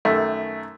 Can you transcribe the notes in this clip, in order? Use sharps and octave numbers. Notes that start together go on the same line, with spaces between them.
F#2 D#3 A3